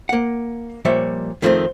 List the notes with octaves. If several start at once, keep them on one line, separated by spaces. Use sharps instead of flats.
A#3 F#5
A#2 F3 G3 C#5 E5
F2 D#3 F3 A3 B3 C4